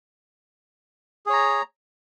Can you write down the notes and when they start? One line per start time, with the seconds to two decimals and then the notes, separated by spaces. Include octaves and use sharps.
1.26 G#4
1.30 C#5
1.33 A#5